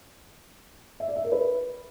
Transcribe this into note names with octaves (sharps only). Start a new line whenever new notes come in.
E5
D5
E5
A#4
B4